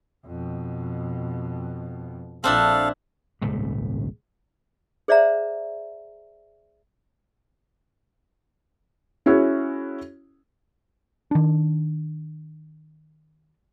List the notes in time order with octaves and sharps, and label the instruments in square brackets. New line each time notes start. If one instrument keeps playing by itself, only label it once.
[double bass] F2 B2
[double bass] A#1 [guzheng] C4 D4 E4 [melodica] A4 F5
[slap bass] D#1 G#1 C#2 A2
[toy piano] G#4 C5 D5 E5 F5 A#5
[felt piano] C#4 E4 F#4 G#4 C#5
[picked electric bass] D#3 D4